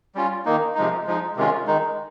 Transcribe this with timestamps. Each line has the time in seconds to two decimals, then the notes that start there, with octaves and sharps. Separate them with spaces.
0.15 G3 C#4 F4
0.46 D#3 A#3 D#4
0.75 C3 F3 G#3 D#4
1.07 F3 G#3 D#4
1.36 C3 D#3 G#3 C#4 F4
1.67 D#3 G#3 D#4